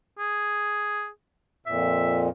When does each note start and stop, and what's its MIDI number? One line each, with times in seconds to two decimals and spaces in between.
0.19 1.08 68
1.66 2.29 41
1.66 2.29 46
1.66 2.23 76